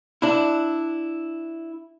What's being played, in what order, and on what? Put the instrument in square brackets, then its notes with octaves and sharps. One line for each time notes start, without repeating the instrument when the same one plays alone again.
[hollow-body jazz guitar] D4 E4